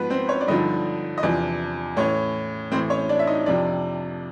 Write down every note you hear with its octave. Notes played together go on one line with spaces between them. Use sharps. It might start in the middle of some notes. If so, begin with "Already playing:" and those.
Already playing: G#2 F3 B3 B4
C4 C5
C#4 C#5
D5
G2 D3 F3 D#4 D#5
D#5
E2 C3 F3 D4 D5
A2 E3 C#4 C#5
A2 E3 C4 C5
C#4 C#5
D4 D5
E5
D#4 D#5
F2 C3 F3 D4 D5